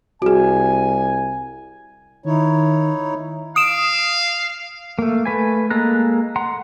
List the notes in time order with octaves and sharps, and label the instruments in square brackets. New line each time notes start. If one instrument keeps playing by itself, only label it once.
[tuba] C2 [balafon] F#4 G#4 [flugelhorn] G#5
[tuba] D#3 [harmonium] D#4 E4 C#5
[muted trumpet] F5 [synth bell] D#6 D7 E7
[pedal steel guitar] A3 A#3
A3 B4 G#5
G#3 A#3 A4 A#5 F#6
F#5 A#5 C6